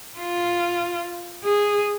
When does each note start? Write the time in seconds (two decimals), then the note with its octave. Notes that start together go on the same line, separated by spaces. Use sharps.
0.18 F4
1.44 G#4